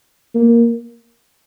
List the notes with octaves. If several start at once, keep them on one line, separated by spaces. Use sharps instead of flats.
A#3